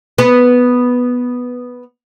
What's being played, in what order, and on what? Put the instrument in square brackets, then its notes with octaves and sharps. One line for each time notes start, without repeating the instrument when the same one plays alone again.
[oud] B3 B4